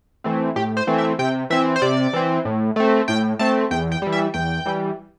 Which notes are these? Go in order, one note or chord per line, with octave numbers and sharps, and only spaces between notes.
E3 A3 C4
A2 G4
C5
E3 A3 C4
E5
C3 G5
E3 C4 E5
C5
C3 D5
E3 C4
A2
A3 C4
A2 G5
A3 C4 A5
E2 G5
G5
E3 G3
E5
E2 G5
E3 G3